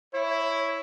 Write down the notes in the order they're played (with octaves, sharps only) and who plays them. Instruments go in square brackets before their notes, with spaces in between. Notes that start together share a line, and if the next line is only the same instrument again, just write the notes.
[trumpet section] E4 [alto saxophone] C#5